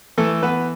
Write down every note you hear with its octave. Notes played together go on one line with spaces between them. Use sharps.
E3 A3 A4
E3 B3 B4